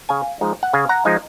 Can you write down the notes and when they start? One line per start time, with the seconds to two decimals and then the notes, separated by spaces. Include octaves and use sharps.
0.09 C#3 F5 G#5
0.41 F3 G#3 D#4
0.63 F#5
0.73 C#3 F5 G#5
0.89 F#5 A#5
1.05 F3 G#3 D#4 F5 G#5